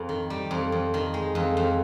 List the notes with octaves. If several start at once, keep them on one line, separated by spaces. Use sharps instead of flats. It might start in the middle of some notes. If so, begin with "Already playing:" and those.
Already playing: F2
D#3
G3
F2
F2
D#3
G#3
F2
F2